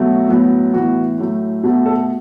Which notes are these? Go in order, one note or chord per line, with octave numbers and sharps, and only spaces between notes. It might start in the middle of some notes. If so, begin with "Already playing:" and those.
Already playing: B2 F#3 A3
A2 F#3 B3
A2 E3 B3 F#4
A2 F#3 A3
B2 A3
A4